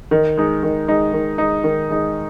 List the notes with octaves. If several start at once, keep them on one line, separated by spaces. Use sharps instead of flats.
D#3
G#3 D#4
D#3
G#3 D#4
D#3
G#3 D#4
D#3
G#3 D#4